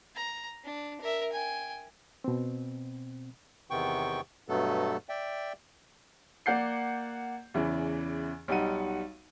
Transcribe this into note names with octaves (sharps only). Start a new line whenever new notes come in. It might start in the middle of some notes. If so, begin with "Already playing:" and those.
A#5
D4
A#4 E5
G5 G#5
B2 C4
E2 C3 D#3 B3 G5 C#6
G2 B2 F#3 A3 B3 A4
D5 E5 G5
A#3 D5 F#5 G6 C7
E2 C#3 E3
B1 G3 D#4 F#5 D#7